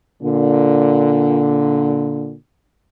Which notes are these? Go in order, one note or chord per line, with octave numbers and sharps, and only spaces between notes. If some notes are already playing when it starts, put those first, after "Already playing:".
A#2 D3